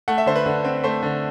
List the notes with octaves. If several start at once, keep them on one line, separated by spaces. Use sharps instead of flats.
A3 F#5
E5
D3 C5
B4
D3
C4
A3 C5
D3